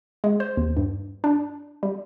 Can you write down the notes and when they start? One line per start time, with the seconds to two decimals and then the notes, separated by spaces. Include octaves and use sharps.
0.24 G#3
0.40 C5
0.57 D#2
0.77 G2
1.24 D4
1.83 G3